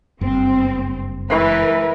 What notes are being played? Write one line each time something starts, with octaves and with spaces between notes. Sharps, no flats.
F#1 G2 C4
E3 G#3 A#4 B4